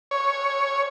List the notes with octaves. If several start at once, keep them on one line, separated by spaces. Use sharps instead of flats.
C#5